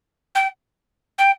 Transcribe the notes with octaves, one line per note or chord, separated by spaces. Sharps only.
G5
G5